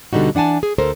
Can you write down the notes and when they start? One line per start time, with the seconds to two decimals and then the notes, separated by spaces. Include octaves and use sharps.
0.13 D2 B2 D3 G3 D#4 F#4
0.35 E3 D4 F#5 G#5 A5
0.63 G#4
0.78 D2 A4 A#4 C5